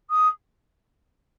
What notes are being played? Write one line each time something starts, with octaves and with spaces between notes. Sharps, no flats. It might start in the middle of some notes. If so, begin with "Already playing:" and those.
D#6